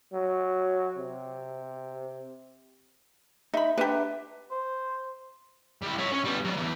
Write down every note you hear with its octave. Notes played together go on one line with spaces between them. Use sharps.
F#3
C3
D#4 E5 B5
D3 G4 B4 E5 A#5
C5
G3 E4
C#5 E5
C#4
G3 B3
F#3 D5
E3 B3